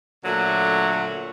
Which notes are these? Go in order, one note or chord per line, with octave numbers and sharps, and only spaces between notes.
A#2 D3 F#3 A3